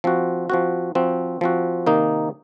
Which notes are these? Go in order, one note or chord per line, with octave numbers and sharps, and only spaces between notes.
F3 C4 F#4
F3 C4 F#4
F3 C4 F#4
F3 C4 F#4
C3 D#3 A#3 D#4